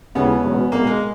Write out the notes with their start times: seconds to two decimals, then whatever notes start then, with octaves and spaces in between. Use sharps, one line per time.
0.15 D#2 C#3 G#3 B3 C#4 E4
0.44 E1 E2 B2 F#3 C#4
0.72 B1 B2 G#3 A#3
0.87 G#3